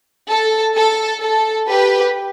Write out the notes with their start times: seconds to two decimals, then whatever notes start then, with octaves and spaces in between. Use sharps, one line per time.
0.30 A4
0.76 A4
1.22 A4
1.68 G4 B4